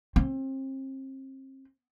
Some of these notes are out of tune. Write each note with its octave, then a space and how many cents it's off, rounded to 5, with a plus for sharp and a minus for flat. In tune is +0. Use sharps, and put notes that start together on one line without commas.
C4 +35